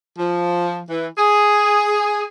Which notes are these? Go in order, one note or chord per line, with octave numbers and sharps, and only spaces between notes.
F3
E3
G#4